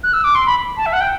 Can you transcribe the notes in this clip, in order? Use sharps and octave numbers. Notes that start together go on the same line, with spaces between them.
F#6
E6
D6
C6
B5
A5
E5
F#5
G5